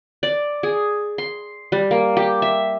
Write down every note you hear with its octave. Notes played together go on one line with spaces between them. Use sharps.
D5
G#4
C6
G3
A#3
G4
E5